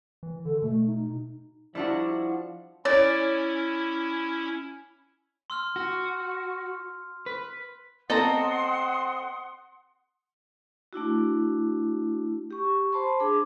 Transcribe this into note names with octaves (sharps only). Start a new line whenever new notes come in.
E3
D3 A4
B2 A3
D#4
F3 G3 D4 E4 F#4 D5 E5
C#4 E4 C#5 D5
C6 E6 F6
F#4
B4
C4 A4 D#5 F#5 A#5 C6 D#6
A3 D4 E4 F#4
G4 C#6
C5 A5 B5 C6
D4 G#4 D6